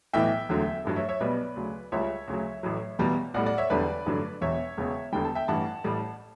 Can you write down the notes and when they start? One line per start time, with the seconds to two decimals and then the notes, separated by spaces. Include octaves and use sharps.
0.13 B1 A2 E3 E5 G5
0.49 E1 D2 D3 F#3
0.85 A1 G2 F#3
0.96 C#5 E5
1.09 C#5 E5
1.20 B1 B2 G3 B4 D5
1.56 D2 C#3 F#3
1.92 C#2 C#3 G3 C#5 E5
2.28 D2 C#3 F#3
2.63 A1 A2 F#3
2.99 E1 E2 B2 G3
3.34 B1 A2 G3 D5 F#5
3.46 D5 F#5
3.58 C#5 E5
3.70 E1 E2 D3 G3 B4 D5
4.06 A1 G2 D3 F#3
4.41 E1 E2 B2 C#5 E5
4.77 E1 E2 C#3
5.12 E1 E2 D3 G3 G5
5.24 A5
5.35 E5 G5
5.48 A1 G2 E3 G3 F#5 A5
5.84 A1 A2 G3